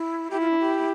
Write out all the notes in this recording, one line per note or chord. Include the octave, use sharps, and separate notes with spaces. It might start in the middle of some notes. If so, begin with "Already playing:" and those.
Already playing: E4
E4 G4
F4
D4
G4